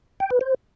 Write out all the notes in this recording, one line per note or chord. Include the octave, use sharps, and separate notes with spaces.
G5
B4
C5